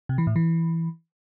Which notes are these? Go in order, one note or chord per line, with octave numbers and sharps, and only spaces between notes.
C3
E3
A2
E3